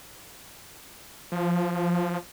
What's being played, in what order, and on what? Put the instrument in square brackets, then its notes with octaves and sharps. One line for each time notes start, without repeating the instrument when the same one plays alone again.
[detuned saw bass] F3